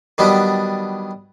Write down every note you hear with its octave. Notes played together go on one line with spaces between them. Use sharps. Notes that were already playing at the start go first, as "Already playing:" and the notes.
D#3 F#3 G3 B3 D4